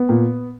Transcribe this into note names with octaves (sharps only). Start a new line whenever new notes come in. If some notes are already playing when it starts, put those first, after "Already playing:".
Already playing: B3
A#2